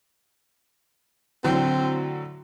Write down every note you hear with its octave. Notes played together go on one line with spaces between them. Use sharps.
A2 D3 F#3 C4